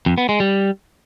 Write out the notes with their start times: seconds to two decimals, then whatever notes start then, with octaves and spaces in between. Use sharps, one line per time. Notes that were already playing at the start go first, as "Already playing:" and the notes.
0.06 F2
0.18 B3
0.29 G#3
0.40 G3